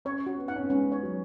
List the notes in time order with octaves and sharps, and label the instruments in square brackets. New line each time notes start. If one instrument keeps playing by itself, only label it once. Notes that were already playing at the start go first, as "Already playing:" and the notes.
[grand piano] C#4 [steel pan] C#5
[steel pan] F#4
[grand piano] B3
[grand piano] D#4 [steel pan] F#5
[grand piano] C#4
B3
[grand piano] G#3 [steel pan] C#4
[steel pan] C#5
[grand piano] F#3